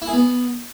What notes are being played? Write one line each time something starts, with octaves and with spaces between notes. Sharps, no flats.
E4
G#4
B3